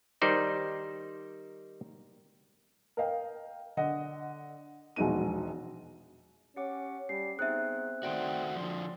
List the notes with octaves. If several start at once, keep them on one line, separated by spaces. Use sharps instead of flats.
D#3 G3 D#4 C5 D5
A#4 D#5 F5 G5
D3 D#5 F#5
E1 A#1 G#3 D#4 F#4 D#7
C#4 G4 F#5 D6
G3 C#4 C7
B3 C4 D#4 G#4 E5 F#6
D#3 A3 F#4 D5 G5 C6
D3 F3 D5 C6